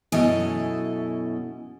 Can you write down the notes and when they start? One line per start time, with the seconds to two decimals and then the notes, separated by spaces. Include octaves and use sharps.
0.12 F#2 B2 E4 A4 D#5 G#5